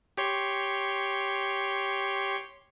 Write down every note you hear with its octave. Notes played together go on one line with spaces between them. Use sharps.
G4 C#5 C6